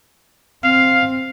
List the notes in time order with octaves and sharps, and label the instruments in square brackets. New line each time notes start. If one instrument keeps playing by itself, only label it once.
[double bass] C4 [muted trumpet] F5